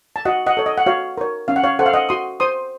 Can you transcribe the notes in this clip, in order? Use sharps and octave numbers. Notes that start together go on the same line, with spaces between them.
A5
F#4 D#5 F#5
D#5 F#5
A4 C#5
D#5
F#5
F#4 C#5 F5
A#4 C#5
C#4 F5
F#5
C#5 F5
A4 C5 F#5
F5
D#5 F#5
F#4 C6 D#6
C5 C6 D#6